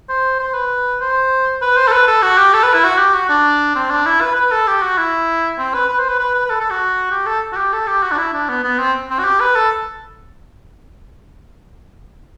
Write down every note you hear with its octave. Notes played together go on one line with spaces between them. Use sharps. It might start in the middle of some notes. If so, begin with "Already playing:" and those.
C5
C5
B4
C5
B4
C5
A4
B4
A4
F#4
G4
A4
B4
E4
F#4
G4
F#4
D4
C4
D4
E4
B4
B4
A4
G4
F#4
E4
C4
B4
B4
C5
B4
B4
B4
B4
A4
A4
F#4
G4
A4
F#4
G4
A4
G4
F#4
D4
E4
D4
B3
B3
C4
C4
F#4
G4
B4
A4